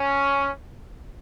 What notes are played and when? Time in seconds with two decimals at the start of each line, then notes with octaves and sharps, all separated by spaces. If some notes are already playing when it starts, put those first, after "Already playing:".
Already playing: C#4